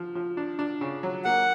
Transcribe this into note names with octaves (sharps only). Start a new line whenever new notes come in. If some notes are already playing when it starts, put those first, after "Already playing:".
Already playing: F3
F3
D4
D4
C#3
F#3
A#3 F#5